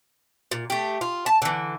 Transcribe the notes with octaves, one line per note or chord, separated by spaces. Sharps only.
A#2
A3 G4
F4
A5
D3 E3